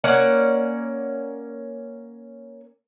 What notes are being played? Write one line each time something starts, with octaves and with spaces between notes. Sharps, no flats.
A#3 C#4 D5 F#5